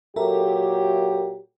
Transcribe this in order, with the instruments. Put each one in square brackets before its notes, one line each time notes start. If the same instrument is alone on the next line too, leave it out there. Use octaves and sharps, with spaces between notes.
[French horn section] A#2 F#3 G4 [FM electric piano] A4 A#4 E5